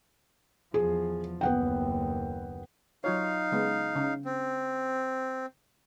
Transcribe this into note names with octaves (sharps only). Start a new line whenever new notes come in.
E2 F3 G#4
F#1 D#2 B3 F#5 G5
F#3 D#4 F4 C#5 F5
C#3 G#3 B3
C#3
C4